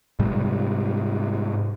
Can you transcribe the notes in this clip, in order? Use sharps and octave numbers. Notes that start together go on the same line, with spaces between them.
G#2 C3 G3